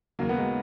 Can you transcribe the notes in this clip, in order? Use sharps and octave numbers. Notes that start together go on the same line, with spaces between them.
D#2 C#3 F#3 A#3
B3
G#3